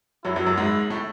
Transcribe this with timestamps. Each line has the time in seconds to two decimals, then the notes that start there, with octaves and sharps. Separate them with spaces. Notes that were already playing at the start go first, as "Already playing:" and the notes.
0.25 F#2 F#3 E4
0.36 F#2 F#3
0.46 F#2 F#3
0.57 G#2 G#3
0.90 A2 A3